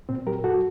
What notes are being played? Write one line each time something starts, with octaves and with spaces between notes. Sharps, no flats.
A#2 C4
F#3 G4 A#4
F#2 F#4 A4